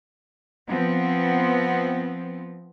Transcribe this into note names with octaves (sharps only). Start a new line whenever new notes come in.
F3 B3 C4